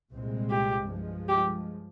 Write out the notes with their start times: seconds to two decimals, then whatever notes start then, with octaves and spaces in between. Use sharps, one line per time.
0.11 C2 A#2 G#3 C4
0.50 G4
0.89 G2 F3 G#3
1.29 G4